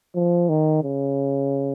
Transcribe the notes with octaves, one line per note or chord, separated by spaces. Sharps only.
F3
D#3
C#3